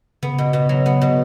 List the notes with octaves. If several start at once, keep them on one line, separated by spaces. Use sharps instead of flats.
C#3 B3
B2
B2
F#3
B3
B2